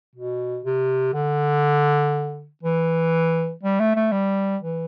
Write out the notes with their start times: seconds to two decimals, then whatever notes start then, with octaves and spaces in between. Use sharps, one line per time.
0.15 B2
0.65 C3
1.14 D3
2.63 E3
3.63 G3
3.80 A3
3.96 A3
4.12 G3
4.63 E3